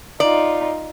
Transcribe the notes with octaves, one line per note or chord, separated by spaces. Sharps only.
D#4 F4 D5